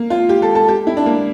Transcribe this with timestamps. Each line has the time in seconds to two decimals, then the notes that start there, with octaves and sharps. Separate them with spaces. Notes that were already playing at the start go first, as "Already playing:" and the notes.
Already playing: A#3
0.10 F4
0.29 G4
0.42 A4
0.55 A4
0.68 G4
0.87 E4
0.97 D4
1.06 A#3